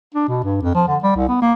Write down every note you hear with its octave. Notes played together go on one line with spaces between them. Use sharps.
D4
B2
G2
F2
F3
D3
G3
C2
B3
A#3